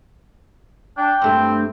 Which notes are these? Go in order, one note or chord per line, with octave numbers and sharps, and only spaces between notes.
D4 G5
G2 A3 C4